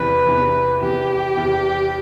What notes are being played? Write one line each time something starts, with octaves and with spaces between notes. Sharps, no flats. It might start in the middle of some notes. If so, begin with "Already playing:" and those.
Already playing: E2 C3 E3 B3 B4
E2 C3 E3 B3
E2 C3 E3 B3 G4
E2 C3 E3 B3